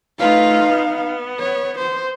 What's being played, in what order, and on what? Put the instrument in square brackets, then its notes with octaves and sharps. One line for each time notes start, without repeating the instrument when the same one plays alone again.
[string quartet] A3 F4 B4 [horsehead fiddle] D#4 F5
[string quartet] B3
[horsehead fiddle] C#5
C5